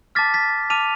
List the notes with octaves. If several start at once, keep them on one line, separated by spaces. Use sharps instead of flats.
A5 D6 F6 A6 B6
A6 B6
A5 D6 F6 D#7 F7